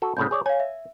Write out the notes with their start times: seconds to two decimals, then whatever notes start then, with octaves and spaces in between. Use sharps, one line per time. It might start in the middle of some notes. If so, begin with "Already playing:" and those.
0.02 F#4 A4
0.17 C2 A2 C#3 G6
0.31 G#4 C#5 D5
0.46 C#5 F5 G#5
0.60 E5